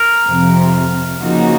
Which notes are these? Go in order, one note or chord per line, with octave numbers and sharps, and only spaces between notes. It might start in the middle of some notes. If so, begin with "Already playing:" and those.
Already playing: A#4
F2 C3 F3 C4
C#3 F3 A#3 D#4 F#4